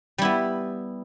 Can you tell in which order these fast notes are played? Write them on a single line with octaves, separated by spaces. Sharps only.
G3 E4 B3